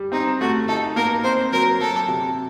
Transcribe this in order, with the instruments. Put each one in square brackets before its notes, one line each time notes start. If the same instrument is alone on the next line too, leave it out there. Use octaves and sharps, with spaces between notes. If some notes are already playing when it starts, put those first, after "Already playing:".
Already playing: [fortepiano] G3
[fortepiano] C4 [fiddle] D#4
[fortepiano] A3 [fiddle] F#4
[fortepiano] D#4 [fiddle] A4
[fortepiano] A#3 [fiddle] A#4
[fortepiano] C4 [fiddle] C5
[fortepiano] F#3 [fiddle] A#4
[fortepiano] F#3 [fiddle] A4
[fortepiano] C3